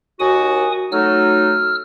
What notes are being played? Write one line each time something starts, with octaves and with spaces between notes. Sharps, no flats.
D#2 F#4 G#5 D#6
F#3 A3 D#4 E6 F6